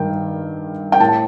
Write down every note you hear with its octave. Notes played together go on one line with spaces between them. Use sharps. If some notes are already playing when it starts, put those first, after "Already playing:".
Already playing: G2 D#3 G5
G5
A2 A5